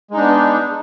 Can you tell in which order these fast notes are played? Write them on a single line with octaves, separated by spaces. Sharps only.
G#3 D#4 D4 B3